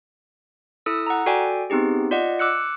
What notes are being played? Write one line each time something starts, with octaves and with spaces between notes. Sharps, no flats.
E4 A4 D#6 E6
F#5 A#5
F#4 A4 D5 G5 G#5
B3 C4 D#4 G4 G#4
F4 D5 D#5 F#5
D6 E6 F#6 C#7